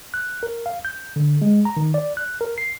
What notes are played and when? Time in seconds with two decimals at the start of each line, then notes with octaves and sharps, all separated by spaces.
0.14 F#6
0.43 A#4
0.66 F5
0.85 G6
1.16 D3
1.42 G#3
1.65 A#5
1.77 D#3
1.94 D5
2.17 F#6
2.41 A#4
2.58 C7